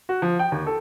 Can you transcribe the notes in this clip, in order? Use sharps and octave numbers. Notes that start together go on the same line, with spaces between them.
F#4
F3
G5
D#2
A4